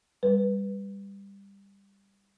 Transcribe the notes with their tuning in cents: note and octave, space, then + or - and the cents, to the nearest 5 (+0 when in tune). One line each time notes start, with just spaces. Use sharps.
G3 +15 B4 +0